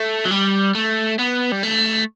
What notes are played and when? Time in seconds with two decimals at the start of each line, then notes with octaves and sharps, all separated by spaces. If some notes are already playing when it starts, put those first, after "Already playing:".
Already playing: A3
0.25 F#3
0.31 G3
0.75 A3
1.19 B3
1.52 G3
1.63 A3